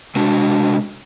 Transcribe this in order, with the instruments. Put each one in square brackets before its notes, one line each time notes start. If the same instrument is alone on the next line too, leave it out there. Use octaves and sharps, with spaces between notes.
[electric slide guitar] C3 G#3 D4 F#4